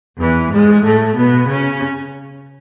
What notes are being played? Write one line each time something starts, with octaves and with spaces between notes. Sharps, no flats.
E2 E3
G#2 G#3
A2 A3
B2 B3
C#3 C#4